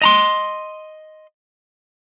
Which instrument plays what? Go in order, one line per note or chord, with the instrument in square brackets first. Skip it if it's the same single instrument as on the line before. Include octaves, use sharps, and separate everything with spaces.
[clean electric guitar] D#5 A#5 C6